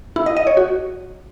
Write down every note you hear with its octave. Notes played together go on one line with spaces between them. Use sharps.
E4
D#5
D#5
C#5
F#4